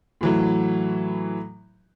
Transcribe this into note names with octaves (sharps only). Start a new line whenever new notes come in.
A2 E3 F#3